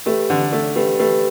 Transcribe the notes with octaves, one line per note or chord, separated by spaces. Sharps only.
A3 G4 B4
D3
A3
A3 G4 B4
A3 G4 B4